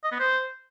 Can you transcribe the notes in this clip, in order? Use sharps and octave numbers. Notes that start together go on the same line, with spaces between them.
D#5
B3
C5